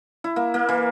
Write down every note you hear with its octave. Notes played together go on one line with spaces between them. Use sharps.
E4
A#3
A#3
E3